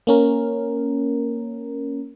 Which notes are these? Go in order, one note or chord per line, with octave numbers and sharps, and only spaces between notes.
A#3 C#4 A#4